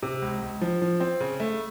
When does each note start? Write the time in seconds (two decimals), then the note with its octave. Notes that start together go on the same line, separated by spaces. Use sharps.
0.03 C3
0.22 C#2
0.42 C#2
0.62 F3
0.82 F3
1.00 C4
1.21 C#3
1.40 A3